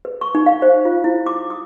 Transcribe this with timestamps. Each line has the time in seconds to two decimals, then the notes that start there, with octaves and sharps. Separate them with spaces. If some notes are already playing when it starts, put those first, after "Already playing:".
0.05 B4
0.21 C#6
0.35 D#4
0.46 F5
0.62 C5
0.85 F4
1.04 E4
1.26 D6
1.50 D#6